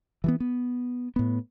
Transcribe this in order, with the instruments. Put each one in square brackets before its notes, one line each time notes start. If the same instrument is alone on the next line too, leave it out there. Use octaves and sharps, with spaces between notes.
[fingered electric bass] E3 F3 B3
B3
A2 B3